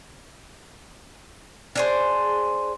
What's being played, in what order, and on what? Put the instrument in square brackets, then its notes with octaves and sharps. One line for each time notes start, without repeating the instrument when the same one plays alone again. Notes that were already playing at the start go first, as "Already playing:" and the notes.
[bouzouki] D4 G#4 C5